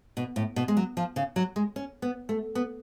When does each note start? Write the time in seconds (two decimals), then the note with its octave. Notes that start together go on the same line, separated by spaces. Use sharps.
0.17 B2
0.36 A2
0.56 B2
0.68 G#3
0.77 F#3
0.97 F3
1.16 C#3
1.36 F#3
1.56 G#3
1.76 C#4
2.02 B3
2.29 A3
2.55 B3